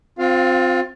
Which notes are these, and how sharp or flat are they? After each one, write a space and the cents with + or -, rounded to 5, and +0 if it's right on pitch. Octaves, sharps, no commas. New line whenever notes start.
C4 +0 F4 +30 F5 -5